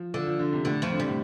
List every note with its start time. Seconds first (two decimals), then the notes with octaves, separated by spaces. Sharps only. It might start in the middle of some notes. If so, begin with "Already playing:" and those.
Already playing: F3
0.14 D3 F3
0.26 F3
0.39 D3
0.53 C3
0.65 A2 D3
0.82 F2 F3
0.92 D3
0.99 C3 G3
1.08 A2